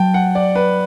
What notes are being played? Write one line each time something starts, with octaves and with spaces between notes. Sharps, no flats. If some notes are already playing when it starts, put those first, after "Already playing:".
Already playing: F#3 G5 A5
F#5
D5
B4